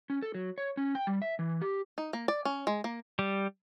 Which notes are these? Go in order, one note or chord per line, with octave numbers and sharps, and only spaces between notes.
C#4
A4
F#3
C#5
C#4
G5
G3
E5
E3
G4
D#4
A#3
D5
C#4
G#3
A#3
G3